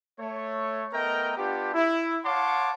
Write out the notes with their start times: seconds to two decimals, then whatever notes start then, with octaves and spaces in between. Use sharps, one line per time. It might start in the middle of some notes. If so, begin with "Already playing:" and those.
0.20 A3 C#5
0.93 A3 B3 A#4 D#5 G5 A#5
1.38 B3 D4 F4 G4
1.74 E4
2.25 C#5 F5 F#5 A5 C6 D6